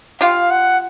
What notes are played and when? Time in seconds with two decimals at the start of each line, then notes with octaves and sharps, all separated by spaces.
0.21 F4 G4 F5
0.51 F#5